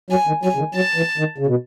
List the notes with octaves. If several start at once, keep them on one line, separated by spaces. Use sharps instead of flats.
F#3 G#5
D#3
F#3 G#5
C#3
D#3
F#3 A5
E3
D#3
C#3
B2